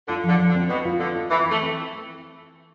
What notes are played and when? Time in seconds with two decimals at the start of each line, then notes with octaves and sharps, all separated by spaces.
0.08 D3 F4
0.24 F3
0.29 D3
0.39 F3
0.49 D3
0.55 C4
0.70 B2 C4
0.85 F4
1.00 D3 C4
1.15 F4
1.30 E3 C4
1.45 E3
1.51 A3
1.62 C4